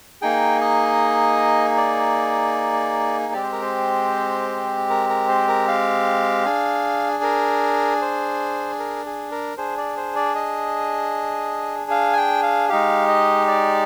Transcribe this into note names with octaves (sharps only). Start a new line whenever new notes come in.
A#3 D#4 G#4 G5
D#5
D5
G#3 C4 G4 D5
C5
A#4
C5
A#4
A#4
C5
A#4
F5
D4 G#4
A#4
C5
A#4
G#4
A#4
D4 G#4 C5
D5
C5
D5
D#5
F5
G#5
G5
F5
G#3 D#4 G4 F5
D#5
D5